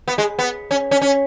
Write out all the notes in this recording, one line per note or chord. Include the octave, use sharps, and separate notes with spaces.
B3
G#3
B3
C#4
C#4
C#4